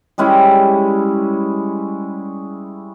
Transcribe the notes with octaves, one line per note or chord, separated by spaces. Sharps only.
G3 G#3 C#4 E4